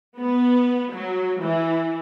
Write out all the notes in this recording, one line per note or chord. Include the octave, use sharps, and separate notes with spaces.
B3
F#3
E3